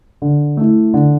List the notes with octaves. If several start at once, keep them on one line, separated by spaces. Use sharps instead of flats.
D3
A3 E4
D3